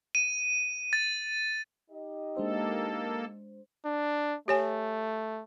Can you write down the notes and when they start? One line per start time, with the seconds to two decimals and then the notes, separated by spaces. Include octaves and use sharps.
0.15 D#7
0.93 A6
1.91 D#4 G4 D#5
2.37 G#3 A#3 D4 A4 C5
3.86 D4
4.48 A3 G4 C#5 G#5